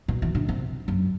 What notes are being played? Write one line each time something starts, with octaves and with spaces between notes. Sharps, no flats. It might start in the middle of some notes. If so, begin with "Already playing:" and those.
B2
E3
D3
C3
F#2